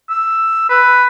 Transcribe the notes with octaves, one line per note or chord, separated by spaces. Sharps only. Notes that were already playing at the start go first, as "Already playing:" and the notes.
E6
B4